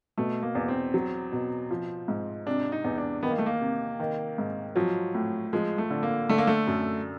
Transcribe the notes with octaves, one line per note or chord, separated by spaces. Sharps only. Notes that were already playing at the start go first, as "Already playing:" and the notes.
B2 A3
A#3
E2
C4
F#3
B2
F3
G#2
C3 D4
D#4
E2
D4
D#3 B3
A#3
A3
A#3
C3
D#3
G#2
F3 F#3
A2
F3 G#3
A3
D3
A#3
D3 A3
A#3
A3
F#2